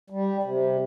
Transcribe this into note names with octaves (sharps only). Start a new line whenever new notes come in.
G3
C3